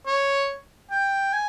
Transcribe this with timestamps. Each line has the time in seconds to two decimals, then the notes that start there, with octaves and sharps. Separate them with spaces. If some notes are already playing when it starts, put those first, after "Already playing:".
0.07 C#5
0.91 G5
1.33 G#5